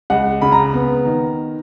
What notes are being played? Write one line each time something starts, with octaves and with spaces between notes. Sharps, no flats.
C#2 F#5
C#3 B5
A#5
B3
D#3